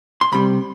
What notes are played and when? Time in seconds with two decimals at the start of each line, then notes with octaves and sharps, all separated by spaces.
0.21 C6
0.32 C2 C3 G3 B5